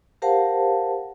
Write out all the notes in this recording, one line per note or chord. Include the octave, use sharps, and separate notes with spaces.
G4 A#4 C5 F5 F#5 A5